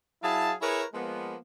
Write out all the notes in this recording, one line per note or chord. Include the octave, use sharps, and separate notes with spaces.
F#3 E4 G#4 F5 A5
E4 G#4 A#4 B4 C#5
F3 G#3 A#3 B3